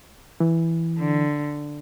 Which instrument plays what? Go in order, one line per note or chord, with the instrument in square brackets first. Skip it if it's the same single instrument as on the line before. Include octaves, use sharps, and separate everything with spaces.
[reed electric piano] E3
[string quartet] D3